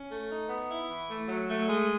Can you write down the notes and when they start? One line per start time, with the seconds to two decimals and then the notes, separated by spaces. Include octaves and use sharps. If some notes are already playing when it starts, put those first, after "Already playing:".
Already playing: C#4
0.09 A3
0.29 D#4
0.49 B3
0.69 E4
0.90 E3
1.09 A3
1.29 F#3
1.50 A3
1.69 G#3